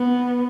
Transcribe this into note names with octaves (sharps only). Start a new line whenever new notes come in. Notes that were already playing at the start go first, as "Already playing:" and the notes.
Already playing: B3